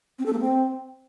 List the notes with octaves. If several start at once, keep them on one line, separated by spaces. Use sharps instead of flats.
C4
A4
A#3
C4